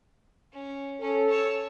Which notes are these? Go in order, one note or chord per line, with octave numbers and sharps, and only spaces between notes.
C#4
C#4 A4
C#5 A5